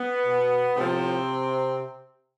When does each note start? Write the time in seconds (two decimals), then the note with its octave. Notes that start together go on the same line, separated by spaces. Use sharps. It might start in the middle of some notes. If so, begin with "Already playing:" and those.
Already playing: B3
0.26 B2
0.75 A2 C3 F3 C4